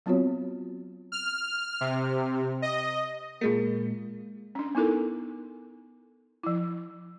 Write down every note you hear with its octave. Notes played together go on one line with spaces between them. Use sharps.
F#3 B3 C4 F4 F#4 C#5
F6
C3
D#5
A#2 G#3 A#3
C#4 D4
B3 D#4 E4 A4 A#4
F3 E4